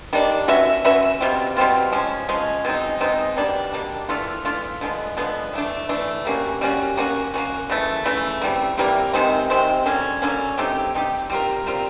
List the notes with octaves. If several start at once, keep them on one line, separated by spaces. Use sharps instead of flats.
D#3 G3 A#3 D4
C#4 F#4 B4 E5
C#4 F#4 B4 E5
B2 G3 C4 F4
B2 G3 C4 F4
F3 G#3 C#4
F3 G#3 C#4
B2 G#3 C4 D#4
B2 G#3 C4 D#4
B2 G3 A#3 D4
B2 G3 A#3 D4
E3 A3 D4 F4
E3 A3 D4 F4
D3 F3 G#3 B3
D3 F3 G#3 B3
E3 A3 D4
E3 A3 D4
G3 A#3 C#4 F#4
G3 A#3 C#4 F#4
A#3 C#4 F#4
A#3 C#4 F#4
C#3 E3 A3
C#3 E3 A3
C3 E3 G3 A#3
C3 E3 G3 A#3
C3 D#3 G#3 C4
C3 D#3 G#3 C4
D3 F#3 A#3 C#4
D3 F#3 A#3 C#4
A3 C4 D#4 G4
A3 C4 D#4 G4
G3 C4 F4 A#4
G3 C4 F4 A#4